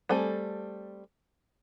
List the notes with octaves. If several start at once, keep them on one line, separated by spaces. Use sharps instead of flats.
G3 A3 C4 A4 G#5